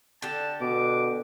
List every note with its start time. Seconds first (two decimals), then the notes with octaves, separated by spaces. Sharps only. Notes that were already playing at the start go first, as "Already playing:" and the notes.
0.22 D3 G4 A5
0.61 B2 D6